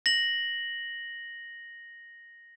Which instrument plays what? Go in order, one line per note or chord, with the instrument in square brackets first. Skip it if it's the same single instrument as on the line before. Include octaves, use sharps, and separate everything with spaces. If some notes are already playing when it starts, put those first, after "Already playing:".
[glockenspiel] A#6 F#7